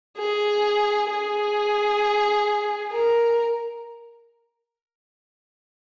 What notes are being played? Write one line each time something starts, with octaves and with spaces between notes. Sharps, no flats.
G#4
G#4
A#4